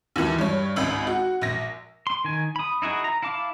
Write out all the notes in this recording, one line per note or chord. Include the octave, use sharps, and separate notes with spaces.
D#2 E3
G2 C#5
G#1 C#2
F#4
A#1 A#6
C6
D#3 G#5
B5 D#6
D#4 E4 F#4 G#4
A#5
E4 F5 A5 D6